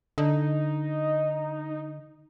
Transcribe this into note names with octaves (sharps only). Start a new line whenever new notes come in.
D3 D#4